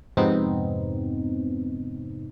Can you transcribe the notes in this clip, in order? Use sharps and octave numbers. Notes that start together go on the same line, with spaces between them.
F2 G#2 C3 B3 C4 D#4